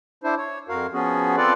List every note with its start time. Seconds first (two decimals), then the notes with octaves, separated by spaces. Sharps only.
0.24 D4 E4 C5
0.38 C#5
0.69 F2 F#4 A#4 F5
0.93 F3 B3 C#4 F#4 G#4
1.37 C4 F4 A4 B4 D5